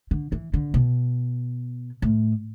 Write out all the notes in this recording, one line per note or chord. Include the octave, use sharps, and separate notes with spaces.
D3
E3
D3
B2
A2